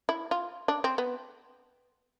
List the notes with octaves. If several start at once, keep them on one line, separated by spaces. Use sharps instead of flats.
E4
F4
D4
C4
B3